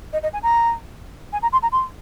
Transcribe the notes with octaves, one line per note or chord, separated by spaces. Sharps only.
D#5
D#5
G#5
A#5
G#5
A#5
C6
A#5
C6